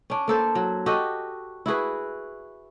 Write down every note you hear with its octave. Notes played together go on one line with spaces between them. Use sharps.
C#4 D4
A#3 A4 C5
F#3
F#4 G4 A4 D#5
E4 F#4 G#4 B4